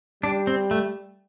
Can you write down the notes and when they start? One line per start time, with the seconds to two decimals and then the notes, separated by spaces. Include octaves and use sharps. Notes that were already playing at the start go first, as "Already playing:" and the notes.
0.23 G3 D4
0.47 C4
0.71 A3